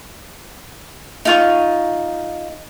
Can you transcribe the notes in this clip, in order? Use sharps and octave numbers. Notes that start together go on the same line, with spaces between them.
D#4 F4 C#6